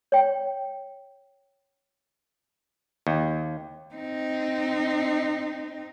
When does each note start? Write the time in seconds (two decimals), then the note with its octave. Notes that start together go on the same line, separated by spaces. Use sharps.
0.12 C#5 G5
3.07 D#2
3.95 C4 D#4